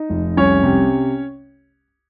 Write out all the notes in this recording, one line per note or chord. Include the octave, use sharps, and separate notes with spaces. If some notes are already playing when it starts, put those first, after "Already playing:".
Already playing: D#4
F1
C2 C#4 C#5
C3